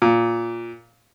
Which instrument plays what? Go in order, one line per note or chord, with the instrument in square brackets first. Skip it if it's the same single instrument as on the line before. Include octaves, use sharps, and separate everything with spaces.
[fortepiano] A#2